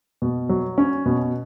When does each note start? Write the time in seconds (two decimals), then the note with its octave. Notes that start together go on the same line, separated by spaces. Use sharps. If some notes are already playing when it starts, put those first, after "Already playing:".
0.22 B2
0.49 F#3
0.78 C#4
1.06 B2